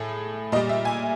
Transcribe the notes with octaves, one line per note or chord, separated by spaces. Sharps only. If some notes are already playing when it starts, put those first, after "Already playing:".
Already playing: A2 G#4 A4
A#2 G3 D#5
E5
G#5